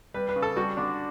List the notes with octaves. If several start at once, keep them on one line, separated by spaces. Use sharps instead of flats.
G3 B4
B4
C#3
A4
G3 F#4
D3 D4